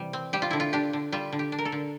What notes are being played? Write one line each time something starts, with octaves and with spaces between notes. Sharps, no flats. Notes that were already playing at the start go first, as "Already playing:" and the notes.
Already playing: C3 E3 G3
C4
G3 G4
F4
D3 E4
F4
D4 G4
D3
G3 F4
D3
G4
D4
A#4
A4
D3